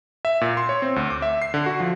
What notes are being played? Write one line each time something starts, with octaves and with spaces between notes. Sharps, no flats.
E5
A#2
C6
C#5
C4
D2
D6
E5
C7
D3
F#4
F3